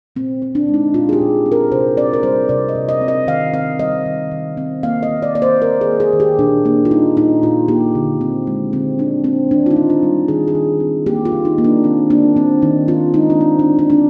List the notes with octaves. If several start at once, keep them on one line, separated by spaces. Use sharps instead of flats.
A#2 C4
C4
D4
G#3
D#4
A#2 F4
G#4
G4
A#2
C4
A#4
C3 C5
C4 D5
A#4
G3 C5
C3 D5
D#5
C3
D#5
C4
D#5
D#3 F5
C4 F5
G3 D#5
D#3
D#3
C4
A#3 F5
D#5
D#3
D5
A#3 D5
C5
D#3 A#4
G#4
A#3
G#4
D#3
G4
A#2 D4
A#3 D4
F4
G3 D#4
A#2 D#4
A#2 F4
A#3 G4
D3
C4
G#3
D3 C4
D3 D4
C4
D#3 D4
F4
D#4
C4
F4
G3
D#3 G#4
G#4
D#3
C4
A#3 G4
F4
D#3
D#4
A#3
D4
D#3 C4
A#3 D4
D#3 C4
D#3 D#4
C4 F4
G#3 D#4
D4
D#3 C4
D4
D#3
D4
C4 D4